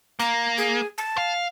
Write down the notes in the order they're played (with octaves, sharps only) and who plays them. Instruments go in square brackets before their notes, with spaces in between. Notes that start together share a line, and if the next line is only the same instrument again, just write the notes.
[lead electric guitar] A#3 [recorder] A#5
[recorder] G#4
A5
[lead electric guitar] F5